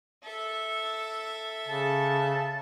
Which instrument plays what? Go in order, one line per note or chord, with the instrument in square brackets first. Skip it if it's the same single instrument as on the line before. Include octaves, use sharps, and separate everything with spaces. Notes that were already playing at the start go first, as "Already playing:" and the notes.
[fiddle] A4 E5
[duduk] C#3 [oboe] A5